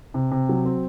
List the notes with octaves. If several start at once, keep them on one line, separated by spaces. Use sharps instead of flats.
C3
C3
F#3
C4